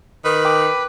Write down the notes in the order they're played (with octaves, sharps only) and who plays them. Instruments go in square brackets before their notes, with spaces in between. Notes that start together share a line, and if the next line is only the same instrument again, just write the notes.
[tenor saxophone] D#3 [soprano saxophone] B4
[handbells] G5 D6